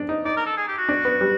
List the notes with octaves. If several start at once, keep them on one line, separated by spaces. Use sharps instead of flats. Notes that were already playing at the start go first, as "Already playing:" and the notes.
Already playing: D4
D#4
D#4 D5
A#4
A4
G#4
G4
F#4
D4
B3
G3